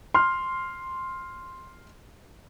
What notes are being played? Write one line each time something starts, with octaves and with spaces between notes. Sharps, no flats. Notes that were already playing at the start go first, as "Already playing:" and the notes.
C6 F6